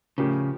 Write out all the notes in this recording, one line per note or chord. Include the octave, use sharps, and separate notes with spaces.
A2 C#3 F3 C#4 G4 A#4